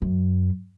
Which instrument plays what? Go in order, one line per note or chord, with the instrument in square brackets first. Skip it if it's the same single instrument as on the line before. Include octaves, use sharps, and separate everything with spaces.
[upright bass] F#2